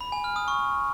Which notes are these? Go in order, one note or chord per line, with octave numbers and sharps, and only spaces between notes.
B5
G#5
F6
D#6
C#6